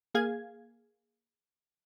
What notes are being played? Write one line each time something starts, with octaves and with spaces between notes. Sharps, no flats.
A#3 G#4 F5 G#6